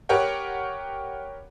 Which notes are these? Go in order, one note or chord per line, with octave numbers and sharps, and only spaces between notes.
G4 A#4 B4 C#5 F#5 G5